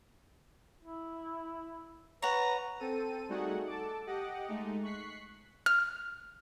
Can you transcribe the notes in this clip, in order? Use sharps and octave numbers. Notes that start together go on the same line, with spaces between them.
E4
B4 C#5 F#5 A#5
C4 A4 D#7
G3 A3 D#4 F#4 G#4 F#5
A4 A5 D6
G4 D#5 F#5 D6
G#3 A3 D#4
C#6 F#6 B6 C7
F6